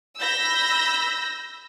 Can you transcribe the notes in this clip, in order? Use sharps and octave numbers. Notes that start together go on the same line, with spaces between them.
B5 E6 G6 A#6